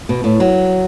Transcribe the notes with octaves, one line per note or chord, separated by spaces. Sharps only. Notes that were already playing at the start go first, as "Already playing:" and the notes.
B2
A2
F#3